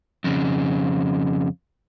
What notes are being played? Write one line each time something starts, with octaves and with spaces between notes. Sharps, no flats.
F2 C#3